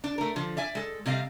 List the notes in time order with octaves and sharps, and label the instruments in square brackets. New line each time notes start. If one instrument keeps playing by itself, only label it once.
[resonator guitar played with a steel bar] D4
A3 A#4
D3 F3
D5 E5 G#5
G#3 A4
C3 G3 D#5 F5